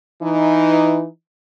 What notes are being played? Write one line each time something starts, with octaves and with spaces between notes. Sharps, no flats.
E3 D#4